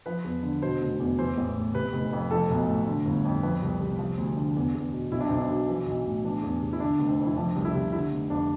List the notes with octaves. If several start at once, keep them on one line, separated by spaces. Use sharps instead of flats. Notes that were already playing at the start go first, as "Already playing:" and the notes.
F3 B4
E2
D3
B2 C5
F1
E2
E3 C5
A1
A2
C3 B4
F1
F2
F3 A4
B1
A2
D3
G1
F2
F3 B4
C2
C3
F3
D2
D3
E2
E2
B2
B1 E4
D4
B1 C4
D4
B2
E3
B1
A2
E3 D4
E2
C3
E4
D3 D4
F1
C4
F2
E4
F3 D4
C2
E4
C3
D3 E4
F1
F2 D4